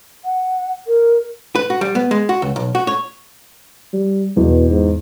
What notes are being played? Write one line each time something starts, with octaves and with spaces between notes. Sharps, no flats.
F#5
A#4
B4
F#4
G3
B3
G#3
F#4
C#2
B1
F#4
C#5
G3
E2 B2
G#2